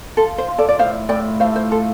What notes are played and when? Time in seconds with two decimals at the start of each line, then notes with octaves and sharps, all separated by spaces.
0.17 F4 A4
0.38 C5
0.48 F4
0.58 A4 D5
0.69 D5
0.79 A2 C5 F5
1.09 A2 D5 G5
1.40 A3 C5 F5
1.56 C5
1.71 F4 A4